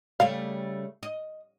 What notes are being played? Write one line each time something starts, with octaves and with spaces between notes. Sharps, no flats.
C#3 G3 A3 F5
D#5